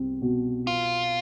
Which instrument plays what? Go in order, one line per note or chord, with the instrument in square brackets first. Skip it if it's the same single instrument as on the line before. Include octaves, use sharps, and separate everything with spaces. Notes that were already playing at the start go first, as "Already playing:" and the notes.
Already playing: [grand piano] C2 C4
B2
[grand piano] B3 [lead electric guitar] F4